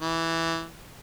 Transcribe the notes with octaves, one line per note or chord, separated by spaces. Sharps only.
E3